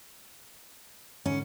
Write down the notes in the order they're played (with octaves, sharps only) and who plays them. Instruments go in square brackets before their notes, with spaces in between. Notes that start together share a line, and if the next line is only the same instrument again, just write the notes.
[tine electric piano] G#2 D3 [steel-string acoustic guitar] C#4